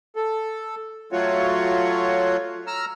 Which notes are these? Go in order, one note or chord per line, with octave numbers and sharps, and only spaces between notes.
A4
F#3 A3 F4 F#4 C#5
A#5 E6 F6